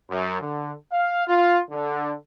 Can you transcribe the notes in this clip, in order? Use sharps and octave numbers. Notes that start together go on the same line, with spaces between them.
F#2
D3
F5
F4
D3